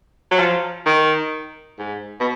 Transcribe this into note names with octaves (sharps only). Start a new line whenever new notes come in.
F#3
F3
D#3
G#2
B2